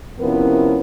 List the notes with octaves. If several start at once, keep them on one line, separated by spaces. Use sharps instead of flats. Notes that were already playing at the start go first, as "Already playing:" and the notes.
C3 F3 B3 C#4 E4 A#4